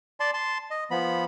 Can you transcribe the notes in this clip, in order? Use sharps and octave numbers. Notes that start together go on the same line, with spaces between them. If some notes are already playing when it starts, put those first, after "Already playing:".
D5 A5 C6
A5 C6
D#5
F3 B3 B5